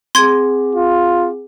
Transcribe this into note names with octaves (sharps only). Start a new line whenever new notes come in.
C4 G#4 C6 G#6
F4